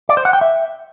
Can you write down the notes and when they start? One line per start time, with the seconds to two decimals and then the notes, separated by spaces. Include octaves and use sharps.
0.09 D5
0.17 C5
0.25 F#5
0.33 G5
0.41 E5